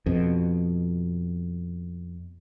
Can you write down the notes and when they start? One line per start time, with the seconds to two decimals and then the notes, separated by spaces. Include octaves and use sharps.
0.06 F2 B2